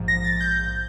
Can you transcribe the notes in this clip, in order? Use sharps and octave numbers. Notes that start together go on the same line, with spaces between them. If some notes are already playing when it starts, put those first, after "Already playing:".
Already playing: A#1 G#2 F3
A#6
A6
G6